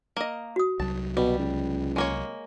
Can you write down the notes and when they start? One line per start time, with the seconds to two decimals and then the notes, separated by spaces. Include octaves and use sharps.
0.17 A#3 D#5
0.56 F#4 D#6
0.80 C2 F#3 A5
1.17 B2 G3
1.39 C#2
1.96 G#3 A#3 C#5